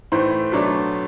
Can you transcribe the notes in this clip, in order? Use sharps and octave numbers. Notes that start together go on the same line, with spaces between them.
A2 E3 A3 C5 C6
B2 F#3 A3 D4